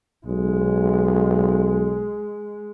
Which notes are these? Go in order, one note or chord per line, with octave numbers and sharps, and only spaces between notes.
B1 G#3